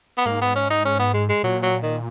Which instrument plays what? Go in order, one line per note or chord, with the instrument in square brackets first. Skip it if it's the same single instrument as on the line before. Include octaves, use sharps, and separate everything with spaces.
[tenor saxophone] B3
[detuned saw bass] G#2 [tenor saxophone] A#3
[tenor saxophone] B3
C#4
D#4
C#4
B3
G#3
G#3
[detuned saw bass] A#2 [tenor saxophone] F#3
[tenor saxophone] F#3
D#3